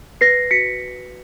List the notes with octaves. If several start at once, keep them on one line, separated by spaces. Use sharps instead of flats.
B4 A#6 C7
F#4 B6 C#7